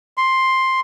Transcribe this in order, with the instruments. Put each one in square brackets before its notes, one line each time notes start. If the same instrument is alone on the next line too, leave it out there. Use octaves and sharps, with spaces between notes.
[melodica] C6